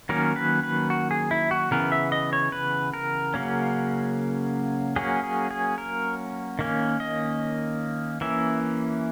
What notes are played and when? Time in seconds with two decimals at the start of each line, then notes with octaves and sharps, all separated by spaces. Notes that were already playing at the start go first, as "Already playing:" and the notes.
0.09 D#3 F#3 A#3 C#4 A#4
0.36 B4
0.63 B4
0.90 F#4
1.11 G#4
1.31 E4
1.51 F#4
1.71 C#3 E3 B3 A#4
1.92 E5
2.12 D#5
2.33 C#5
2.52 B4
2.94 A#4
3.34 C#3 F#3 A#3 C#4
4.96 F#3 A#3 C#4 G#4
5.23 G#4
5.51 G#4
5.78 A#4
6.59 D#3 A#3 C#4
7.00 D#5
8.21 E3 A#3 C#4 E5